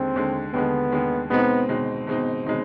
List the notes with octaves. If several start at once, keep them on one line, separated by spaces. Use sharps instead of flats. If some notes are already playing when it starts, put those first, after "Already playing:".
Already playing: D#2 D3 G#3 C4
D#2 D3 G#3
D#2 D3 G#3 B3
D#2 D3 G#3
B2 G#3 B3 C4 D#4
B2 G#3 C4 D#4
B2 G#3 C4 D#4
B2 G#3 C4 D#4